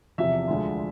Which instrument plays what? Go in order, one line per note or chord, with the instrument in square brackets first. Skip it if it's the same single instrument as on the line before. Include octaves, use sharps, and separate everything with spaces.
[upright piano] E2 C3 F3 E5
D2 D3 F3 G#3